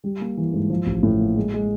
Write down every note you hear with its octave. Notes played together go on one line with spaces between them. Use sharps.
G3
A#3
E3
G#2
F3
A1
A2
A#3
G#3
G#3